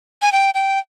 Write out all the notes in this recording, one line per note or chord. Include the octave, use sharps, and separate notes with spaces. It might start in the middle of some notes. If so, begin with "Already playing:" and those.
G#5
G5
G5